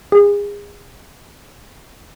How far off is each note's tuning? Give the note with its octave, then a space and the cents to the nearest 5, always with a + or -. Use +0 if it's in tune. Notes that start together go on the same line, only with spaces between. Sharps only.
G#4 -30